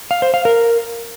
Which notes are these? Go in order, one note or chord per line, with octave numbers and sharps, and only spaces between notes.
F5
C5
F5
A#4